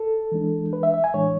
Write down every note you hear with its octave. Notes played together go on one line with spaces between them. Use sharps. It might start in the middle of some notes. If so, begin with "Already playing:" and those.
Already playing: A4
E3 G#3 D4
B4
E5
E5
G#5
A2 E3 G#3 D4 C#5